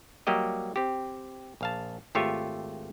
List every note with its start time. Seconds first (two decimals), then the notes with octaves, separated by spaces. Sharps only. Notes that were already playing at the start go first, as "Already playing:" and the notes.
0.27 F#3 G3 A#3 G4 D#5
0.76 C4 G4
1.61 A#1 F5 A5
2.15 G#1 A3 F4 G4 C#5 E5